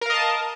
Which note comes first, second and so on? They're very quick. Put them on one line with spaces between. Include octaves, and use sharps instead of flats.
A#4 F5 D#5 A5